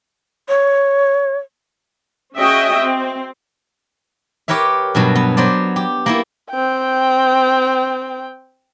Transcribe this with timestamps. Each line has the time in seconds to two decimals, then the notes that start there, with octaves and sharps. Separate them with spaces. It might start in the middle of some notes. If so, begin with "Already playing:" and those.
0.49 C#5
2.36 C#4 F#4 G#4 D#5 E5 G5
2.80 C4
4.48 G4 A#4 B4 C#5 E5
4.95 G2 B2 F#3
5.15 B3
5.37 F#3 B3 C5 D5
5.76 G4
6.06 A#3 B3 E4
6.50 C4 G5